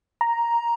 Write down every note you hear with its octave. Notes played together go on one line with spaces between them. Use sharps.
A#5